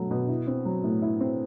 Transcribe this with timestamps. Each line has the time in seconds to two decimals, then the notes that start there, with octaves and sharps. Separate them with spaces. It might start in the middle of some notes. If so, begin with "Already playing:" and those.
Already playing: B2 F#3 A3
0.11 B2
0.29 E4
0.47 C4
0.65 F#3
0.84 A2
1.02 E4
1.21 C4